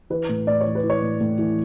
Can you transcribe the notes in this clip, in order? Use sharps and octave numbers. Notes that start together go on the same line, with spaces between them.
E3 B4
A2
A2 D5
C#5
E3
B4
E3
C#5
A2
A2
E3